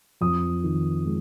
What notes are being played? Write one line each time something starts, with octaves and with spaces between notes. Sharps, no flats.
F2 D#6
D#3
G#3